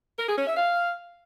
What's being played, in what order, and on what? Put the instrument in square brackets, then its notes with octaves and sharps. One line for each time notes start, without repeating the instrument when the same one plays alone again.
[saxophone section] A#4
G#4
C#4
E5
F5